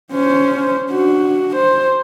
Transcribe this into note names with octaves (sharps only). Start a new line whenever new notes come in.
C#4 C5
D4 F#4
C5